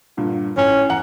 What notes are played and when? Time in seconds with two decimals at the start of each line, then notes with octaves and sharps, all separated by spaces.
0.17 G2 A#2 D3
0.57 A2 C#4
0.89 E2 F#5 A#5